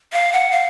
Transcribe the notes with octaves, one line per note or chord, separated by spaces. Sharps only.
F5
F#5
F5